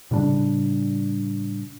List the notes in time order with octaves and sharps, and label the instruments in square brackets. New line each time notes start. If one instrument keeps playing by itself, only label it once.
[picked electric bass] A2 C#3 G3 D4